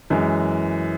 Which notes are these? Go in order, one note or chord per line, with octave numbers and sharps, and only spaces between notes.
F#2 E3 G#3